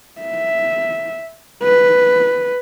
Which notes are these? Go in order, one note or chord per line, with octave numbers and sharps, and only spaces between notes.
E5
B4